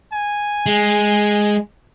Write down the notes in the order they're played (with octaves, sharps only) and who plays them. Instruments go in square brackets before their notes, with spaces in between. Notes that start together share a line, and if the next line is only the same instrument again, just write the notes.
[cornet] G#5
[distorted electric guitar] G#3